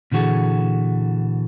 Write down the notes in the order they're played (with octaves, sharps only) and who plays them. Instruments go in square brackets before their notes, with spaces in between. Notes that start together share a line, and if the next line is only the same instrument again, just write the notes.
[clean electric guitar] A#2 D3 E3 F#4 G#4 A4